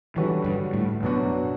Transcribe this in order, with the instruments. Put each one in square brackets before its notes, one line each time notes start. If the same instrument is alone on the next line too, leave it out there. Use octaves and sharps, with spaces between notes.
[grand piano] D3 G3 C#4 F#4 B4 [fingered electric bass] E3
[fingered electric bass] G2
A2
[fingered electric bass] F#2 [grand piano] B2 F#3 B3 D4 F#4